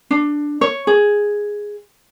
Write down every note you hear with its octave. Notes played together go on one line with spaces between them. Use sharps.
D4
C#5
G#4